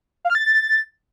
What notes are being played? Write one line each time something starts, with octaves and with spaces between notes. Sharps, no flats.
F5
F6
A6